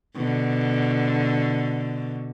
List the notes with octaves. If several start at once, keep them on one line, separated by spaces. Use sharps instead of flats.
B2 D3